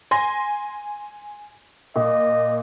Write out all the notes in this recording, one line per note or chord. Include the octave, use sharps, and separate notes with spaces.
G#5 C6 A#6
A#2 D#5